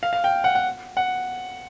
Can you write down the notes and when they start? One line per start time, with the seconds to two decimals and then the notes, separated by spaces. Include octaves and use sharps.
0.03 F5
0.13 F5
0.24 G5
0.44 F#5
0.55 F#5
0.97 F#5